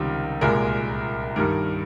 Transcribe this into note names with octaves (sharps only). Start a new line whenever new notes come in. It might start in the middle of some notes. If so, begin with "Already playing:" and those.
Already playing: C#2 C3 D#3 G3 A#4
C2 A#2 G#3 A#4
G2 D#3 G3 A#4